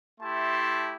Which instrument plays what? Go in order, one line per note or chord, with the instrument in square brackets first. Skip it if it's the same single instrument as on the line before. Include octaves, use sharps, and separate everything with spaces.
[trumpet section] A3 E4 G4 A5 C6